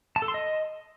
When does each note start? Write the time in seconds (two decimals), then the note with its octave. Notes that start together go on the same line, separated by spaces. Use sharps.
0.16 A5
0.22 A4
0.28 C6
0.34 D#5